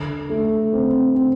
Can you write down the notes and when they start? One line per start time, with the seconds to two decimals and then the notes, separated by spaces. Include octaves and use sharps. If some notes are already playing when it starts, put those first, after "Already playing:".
Already playing: D3
0.29 A3
0.73 C4
1.15 C4